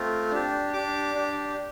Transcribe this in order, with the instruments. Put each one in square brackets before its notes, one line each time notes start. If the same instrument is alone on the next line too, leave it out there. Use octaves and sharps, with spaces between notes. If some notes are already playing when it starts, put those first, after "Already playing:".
Already playing: [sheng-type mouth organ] A3 C4 F4
D4 G4
D4 G4 D6
D4 G4